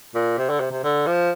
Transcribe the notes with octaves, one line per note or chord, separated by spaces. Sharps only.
A#2
C3
D3
C3
C3
D3
F3